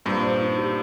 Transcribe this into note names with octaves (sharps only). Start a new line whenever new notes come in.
G2 A#2 C4
C5
D#4
G4